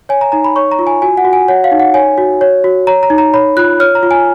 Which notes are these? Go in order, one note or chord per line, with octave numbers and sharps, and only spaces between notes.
C#5 G#5
A#5
D#4 A#5
B5
C#5 C#6
A#5
F4
G#5
F#4 G#5
F#5
F#4
G#5
C#5 F#5
F5
D#4
F#5
C#5 G#5
F#4
C#5
F#4
C#5 A#5
A#5
D#4
A#5
C#5 B5
F4 F#6
C#5 F6
A#5
F4
G#5